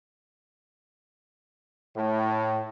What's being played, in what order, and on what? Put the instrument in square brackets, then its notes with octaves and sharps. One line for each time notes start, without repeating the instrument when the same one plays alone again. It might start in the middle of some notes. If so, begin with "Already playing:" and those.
[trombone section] A2